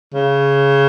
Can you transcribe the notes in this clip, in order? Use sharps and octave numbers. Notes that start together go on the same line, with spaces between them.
C#3